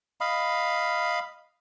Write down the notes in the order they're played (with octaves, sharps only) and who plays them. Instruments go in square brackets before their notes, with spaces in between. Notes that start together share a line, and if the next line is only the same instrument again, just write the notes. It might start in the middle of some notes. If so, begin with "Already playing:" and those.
[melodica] D#5 F5 B5